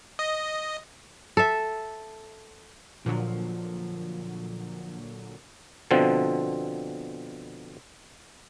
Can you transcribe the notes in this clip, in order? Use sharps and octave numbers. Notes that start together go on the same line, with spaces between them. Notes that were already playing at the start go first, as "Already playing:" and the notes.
D#5
A4 E5
A#2 D3 F3 F#3
B2 D3 F3 C4